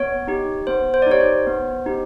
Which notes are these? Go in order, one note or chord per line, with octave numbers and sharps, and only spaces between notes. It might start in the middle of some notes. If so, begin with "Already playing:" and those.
Already playing: B3 C#5
D#4 G4
B3 C5
C5
D5
D#4 G4 C#5
C5
B3
D#4 G4